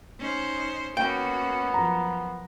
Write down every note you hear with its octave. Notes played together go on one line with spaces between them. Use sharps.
C#4 D#4 C5
A#3 B3 C#4 F#4 G5
F#2 F3 A#5